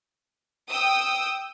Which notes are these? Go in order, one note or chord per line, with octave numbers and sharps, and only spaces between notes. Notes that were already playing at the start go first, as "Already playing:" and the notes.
G5 D#6 E6